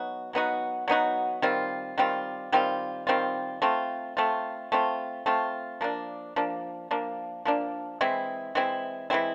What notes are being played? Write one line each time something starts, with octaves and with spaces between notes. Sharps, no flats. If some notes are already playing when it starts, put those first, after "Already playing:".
Already playing: F#3 B3 D#4 F#4
F#3 B3 D#4 F#4
F#3 B3 D#4 F#4
D#3 G3 C4 F4
D#3 G3 C4 F4
D#3 G3 C4 F4
D#3 G3 C4 F4
A3 C4 F4
A3 C4 F4
A3 C4 F4
A3 C4 F4
F3 A#3 D4
F3 A#3 D4
F3 A#3 D4
F3 A#3 D4
E3 G#3 C4 E4
E3 G#3 C4 E4
E3 G#3 C4 E4